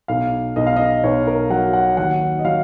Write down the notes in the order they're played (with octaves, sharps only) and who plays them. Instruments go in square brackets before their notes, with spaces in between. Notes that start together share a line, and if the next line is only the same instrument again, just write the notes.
[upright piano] B1 F5
B1 D#5
F5
D#5
B1 C#5
A#4
F#3 F#5
F#5
D#2 F#5
D#5
F#3 F5